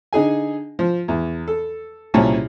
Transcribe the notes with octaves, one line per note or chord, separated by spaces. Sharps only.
D3 D#4 G#4 G#5
F3
E2
A4
C2 A#2 C#3 C#4 C#5 A5